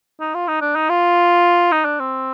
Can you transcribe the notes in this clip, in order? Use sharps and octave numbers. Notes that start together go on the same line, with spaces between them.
D#4
F4
D#4
D4
D#4
F4
D#4
D4
C4